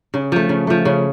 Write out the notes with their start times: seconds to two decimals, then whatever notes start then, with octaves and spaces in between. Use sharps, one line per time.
0.14 C#3
0.32 F3 A3
0.49 C#3
0.67 F3 A3
0.85 C#3